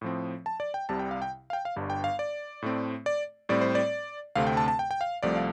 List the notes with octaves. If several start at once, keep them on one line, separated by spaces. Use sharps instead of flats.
A2 F3 C4
A5
D5
G5
C2 C3 G3 A5
G5
F5
G5
F5
G5
F5
G1 G2 G3
G5
F5
D5
A2 A3 C4
D5
A2 G3 C4 D5
C5
D5
D2 C3 A3 C4 F5
G5
A5
A5
G5
G5
F5
C2 C3 F3 A3 D5
F5